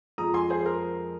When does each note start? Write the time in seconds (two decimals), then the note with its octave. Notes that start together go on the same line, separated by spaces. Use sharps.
0.18 F2 F3 G#3 A#5 D#6
0.34 G#5 C6
0.50 G#4 C5
0.66 A#4